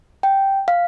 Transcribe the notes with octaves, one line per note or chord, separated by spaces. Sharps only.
G5
F5